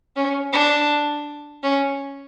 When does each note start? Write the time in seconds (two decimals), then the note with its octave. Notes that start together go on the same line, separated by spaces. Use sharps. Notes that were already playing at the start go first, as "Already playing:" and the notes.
0.16 C#4
0.53 D4
1.63 C#4